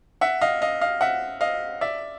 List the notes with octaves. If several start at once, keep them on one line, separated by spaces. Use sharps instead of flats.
E5 F#5
D#5 F5
D#5 F5
D#5 F5
E5 F#5
D#5 F5
D5 E5